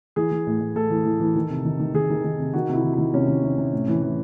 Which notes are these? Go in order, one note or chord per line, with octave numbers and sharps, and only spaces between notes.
E3 G#4
E3
A2
A2
A2 A4
E3
E3
E3
D#3
C3
D#3
D#3
D#3 G#4
D#3
D#3
C3
D#3 F#4
C3 E4
D#3
D#3 E4
C3 C#4
D#3
C3
C3
A2
E3
E3